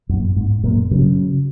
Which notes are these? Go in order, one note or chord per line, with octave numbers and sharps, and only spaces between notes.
F#2 A#2
G#2
F#2 A#2
C#3 F#3